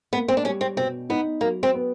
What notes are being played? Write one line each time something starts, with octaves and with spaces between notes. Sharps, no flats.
A#3 B3
C4
D4
G3 C#4
C4
B2 C4
B3 D#4
F#3 A#3
C4
B3